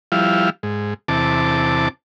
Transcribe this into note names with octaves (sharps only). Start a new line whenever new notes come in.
F3 G3 E4 F5
G#2
E2 C3 A5 D6